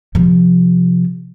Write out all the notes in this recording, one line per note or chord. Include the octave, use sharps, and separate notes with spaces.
C3 F3